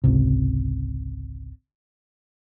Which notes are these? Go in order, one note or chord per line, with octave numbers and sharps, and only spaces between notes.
G#1 C#2 C3